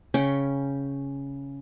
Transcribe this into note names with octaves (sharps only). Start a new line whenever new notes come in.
C#3 C#4 G5 C#6